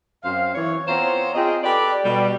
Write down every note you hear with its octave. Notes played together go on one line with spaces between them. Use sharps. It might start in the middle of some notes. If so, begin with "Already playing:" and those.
F#2 C4 C5 F5
E3 C#5
B3 C4 F4 C5 C#5 A#5
C4 F4 G#4 D#5 G5
G4 A4 B4 D5
B2 G3